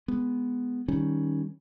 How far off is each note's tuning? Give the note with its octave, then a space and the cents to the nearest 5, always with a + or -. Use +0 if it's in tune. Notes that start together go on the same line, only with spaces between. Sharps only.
G#3 +0 B3 +0
D#3 +0 G3 +0 C#4 +0